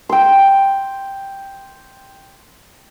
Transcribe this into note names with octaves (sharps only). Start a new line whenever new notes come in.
G5 C6